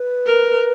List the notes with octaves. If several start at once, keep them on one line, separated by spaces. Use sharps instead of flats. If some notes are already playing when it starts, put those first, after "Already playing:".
Already playing: B4
A#4